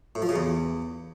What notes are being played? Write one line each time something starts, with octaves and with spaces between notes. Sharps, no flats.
A2
F3
C#3
E2